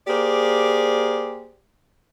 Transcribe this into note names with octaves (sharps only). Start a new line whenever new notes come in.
A#3 G4 G#4 C5 D5